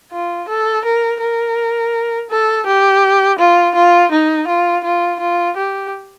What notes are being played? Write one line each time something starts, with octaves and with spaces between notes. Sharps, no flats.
F4
A4
A#4
A#4
A4
G4
F4
F4
D#4
F4
F4
F4
G4